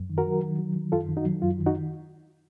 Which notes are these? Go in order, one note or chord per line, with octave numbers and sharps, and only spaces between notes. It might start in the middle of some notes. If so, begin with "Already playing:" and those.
Already playing: F#2
D#3
F#4 A#4
F#3
D#3
F#3
D#3
F#2 F4 A4
D#3
D#4 F#4
F#3
F#2 F4
D#3
D#4 F#4